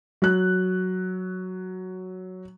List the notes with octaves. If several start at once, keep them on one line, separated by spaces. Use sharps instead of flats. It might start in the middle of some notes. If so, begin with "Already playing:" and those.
F#3 F#6